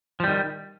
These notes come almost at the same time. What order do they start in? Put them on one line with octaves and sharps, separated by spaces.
F3 G3 D#3